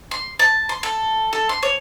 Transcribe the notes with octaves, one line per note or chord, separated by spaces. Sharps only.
C6
A5
C6
A4
A4
C6
C#5